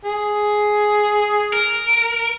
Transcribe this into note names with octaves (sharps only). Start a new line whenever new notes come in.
G#4
A#4